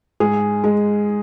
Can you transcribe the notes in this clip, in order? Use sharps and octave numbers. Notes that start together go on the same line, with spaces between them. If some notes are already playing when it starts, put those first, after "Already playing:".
G#2 G#4
G#3